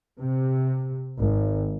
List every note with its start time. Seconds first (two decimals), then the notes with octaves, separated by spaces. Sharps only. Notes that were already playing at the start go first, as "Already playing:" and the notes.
0.19 C3
1.19 G#1